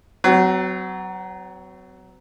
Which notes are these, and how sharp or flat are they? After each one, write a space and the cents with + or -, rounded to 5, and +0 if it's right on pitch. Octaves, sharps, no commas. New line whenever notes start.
F#3 +20 C4 -40